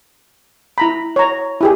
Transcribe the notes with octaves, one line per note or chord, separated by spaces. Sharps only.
E4 A#5 B5
C#5 A#5
E4 G4 G#4